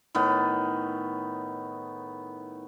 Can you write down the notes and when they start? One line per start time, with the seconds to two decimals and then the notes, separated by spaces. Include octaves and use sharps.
0.15 A2 D#3 B3